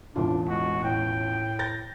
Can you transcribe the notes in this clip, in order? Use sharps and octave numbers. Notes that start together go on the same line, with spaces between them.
E1 A1 D4 F4
G#3 F#4
A2 G5
G6 A6 A#6